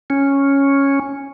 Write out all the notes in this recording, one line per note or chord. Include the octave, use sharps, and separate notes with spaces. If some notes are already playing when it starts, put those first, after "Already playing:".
C#4